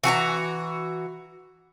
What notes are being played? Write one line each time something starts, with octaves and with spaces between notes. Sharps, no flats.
E3 F#4 G#4 A#5